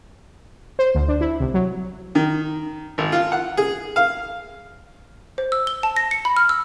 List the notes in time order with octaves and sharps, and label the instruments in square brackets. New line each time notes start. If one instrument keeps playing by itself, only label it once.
[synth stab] C5
D2
D4
E4
C2
F#3
[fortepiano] D#3
G#1
F4
F#5
G#4
F5
[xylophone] C5
E6
G7
A5
A#6
C#7
B5
F6
E6